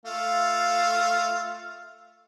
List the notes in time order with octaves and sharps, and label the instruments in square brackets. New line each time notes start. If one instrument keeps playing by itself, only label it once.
[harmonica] A3 F4 F5